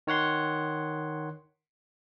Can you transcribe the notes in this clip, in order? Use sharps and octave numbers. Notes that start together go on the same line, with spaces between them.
D#3 C#5 F#5 C6